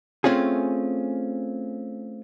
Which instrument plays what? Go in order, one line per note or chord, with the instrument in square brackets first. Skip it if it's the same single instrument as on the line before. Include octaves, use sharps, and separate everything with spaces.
[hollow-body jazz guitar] A3 C4 C#4 F4 G#4